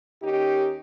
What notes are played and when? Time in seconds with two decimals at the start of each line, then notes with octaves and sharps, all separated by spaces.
0.21 D#2 C#4 D#4 G4